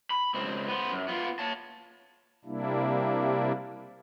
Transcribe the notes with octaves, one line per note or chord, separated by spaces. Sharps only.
B5
C#2 C4
B3 C5
F#2
B3 F4
C#5 A5
C3 G3 A#3 D4 E4